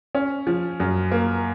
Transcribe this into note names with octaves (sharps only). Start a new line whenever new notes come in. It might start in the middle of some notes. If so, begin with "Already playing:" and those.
C#4
F3
F#2
A#3